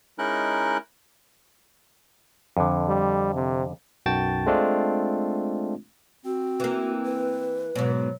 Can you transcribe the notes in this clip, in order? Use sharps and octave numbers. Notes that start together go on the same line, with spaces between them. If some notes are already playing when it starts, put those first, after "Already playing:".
G#3 C#4 D#4 E4 A#4 F#6
F2 D3
G3
C3
B1 F#2 F#4 G5 A5 A6
G#3 A3 C4 D4 F4
C4 F#4
E3 A#3
B4
G#2 B2 F#3